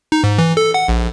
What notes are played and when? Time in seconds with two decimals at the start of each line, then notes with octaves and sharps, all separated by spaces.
0.12 D#4
0.24 G#2
0.38 E3
0.57 A4
0.74 F#5
0.88 A#1